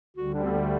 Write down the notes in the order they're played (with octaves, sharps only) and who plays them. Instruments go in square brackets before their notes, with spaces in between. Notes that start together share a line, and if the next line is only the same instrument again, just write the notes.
[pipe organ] D2 D3 G3 [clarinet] F#4
[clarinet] D4
C4
B3
A3